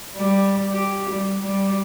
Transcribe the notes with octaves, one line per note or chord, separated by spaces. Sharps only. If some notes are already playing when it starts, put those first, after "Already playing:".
G3
G4
G3
G3